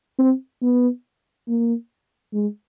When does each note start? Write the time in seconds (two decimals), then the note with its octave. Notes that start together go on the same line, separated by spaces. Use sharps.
0.19 C4
0.62 B3
1.48 A#3
2.33 G#3